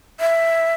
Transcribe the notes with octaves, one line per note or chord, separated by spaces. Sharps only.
E5